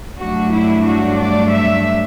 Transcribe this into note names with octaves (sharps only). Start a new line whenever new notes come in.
G2 F#3 A3 D4 F#4
E4
F#4
D5
E5